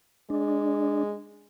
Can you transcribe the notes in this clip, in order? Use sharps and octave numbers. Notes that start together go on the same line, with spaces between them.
G#3 D4